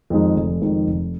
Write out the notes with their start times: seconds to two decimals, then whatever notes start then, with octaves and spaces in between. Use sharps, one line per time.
0.10 F2 D#3 G#3 D#4
0.36 F1
0.61 F2 D#3 G#3 D#4
0.87 F1